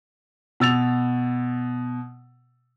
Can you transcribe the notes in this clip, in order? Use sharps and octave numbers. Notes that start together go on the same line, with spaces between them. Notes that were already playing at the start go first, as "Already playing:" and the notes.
B2 E6 A6 F7